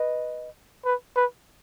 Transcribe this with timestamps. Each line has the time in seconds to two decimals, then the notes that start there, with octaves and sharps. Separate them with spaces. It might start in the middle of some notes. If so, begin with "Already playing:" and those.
Already playing: B4 D#5
0.85 B4
1.16 B4